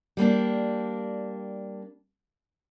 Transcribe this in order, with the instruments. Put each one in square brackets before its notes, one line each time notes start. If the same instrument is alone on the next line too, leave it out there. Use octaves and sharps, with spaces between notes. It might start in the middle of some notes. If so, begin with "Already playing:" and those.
[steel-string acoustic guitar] G3 A#3 C4 D4